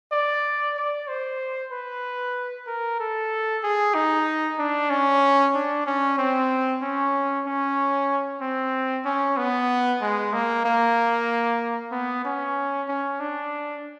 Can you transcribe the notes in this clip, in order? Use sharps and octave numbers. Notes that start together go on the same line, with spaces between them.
D5
D5
C5
B4
A#4
A4
G#4
D#4
D4
C#4
D4
C#4
C4
C#4
C#4
C4
C#4
B3
G#3
A#3
A#3
B3
C#4
C#4
D4